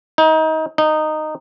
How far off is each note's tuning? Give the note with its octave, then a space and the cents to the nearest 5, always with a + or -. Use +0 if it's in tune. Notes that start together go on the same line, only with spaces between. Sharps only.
D#4 +25
D#4 -15